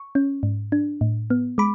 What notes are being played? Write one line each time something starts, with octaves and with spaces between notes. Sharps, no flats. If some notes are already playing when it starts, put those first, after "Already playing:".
Already playing: C#6
C#4
G#2
D4
A2
B3
G#3 B5 D6